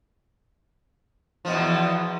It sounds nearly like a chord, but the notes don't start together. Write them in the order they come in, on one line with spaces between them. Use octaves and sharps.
F3 B2 E2